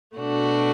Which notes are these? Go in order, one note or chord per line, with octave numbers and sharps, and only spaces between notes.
B2 A3 D4 F#4